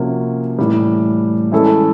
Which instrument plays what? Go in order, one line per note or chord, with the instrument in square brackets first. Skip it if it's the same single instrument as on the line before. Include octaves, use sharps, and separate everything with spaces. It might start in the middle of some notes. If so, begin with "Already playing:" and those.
Already playing: [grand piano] C3 F3 A#3 C#4 F#4
A2 E3 G3
E3 G#3 C#4 E4 A4